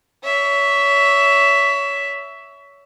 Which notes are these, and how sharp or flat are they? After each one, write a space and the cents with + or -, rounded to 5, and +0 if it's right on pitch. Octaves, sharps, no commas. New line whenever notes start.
C#5 +25 E5 +0